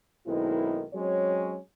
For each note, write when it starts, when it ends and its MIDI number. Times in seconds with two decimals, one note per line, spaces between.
0.27 0.84 35
0.27 0.84 51
0.27 0.84 56
0.27 0.84 58
0.27 0.84 60
0.27 0.84 64
0.94 1.57 54
0.94 1.57 56
0.94 1.57 60
0.94 1.57 61
0.94 1.57 73